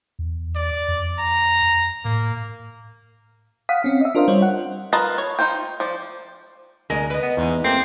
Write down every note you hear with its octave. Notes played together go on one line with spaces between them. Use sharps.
E2
D5
F2
A#5
A2 A#3
F5 F#5 D#6 B6
C4 C#4 F5
D#5 E5
D4 F4 A#4 C5 D#5 F5
G3 F4 C5 C#5
F#5
F4 A#4 B4 D#5 A5
C#5
D#4 F4 C5 G5
F3 D5
D2 G#3 A#4 D#5
B4 D#5
B3
E2 G#2
A3 A#3 C4 G4